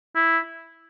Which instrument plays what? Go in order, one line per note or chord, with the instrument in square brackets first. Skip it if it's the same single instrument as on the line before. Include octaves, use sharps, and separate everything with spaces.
[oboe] E4